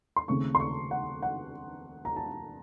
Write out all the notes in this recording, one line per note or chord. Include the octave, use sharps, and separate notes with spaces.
C6
D#2 C#3 A3 C4 C#6
C6
C#6
F#5
F#5
A#5
A5